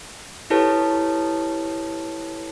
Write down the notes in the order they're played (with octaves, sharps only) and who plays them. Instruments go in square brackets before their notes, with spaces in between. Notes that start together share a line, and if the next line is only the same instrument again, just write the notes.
[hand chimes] E4 G4 A4 B4 C#5 A5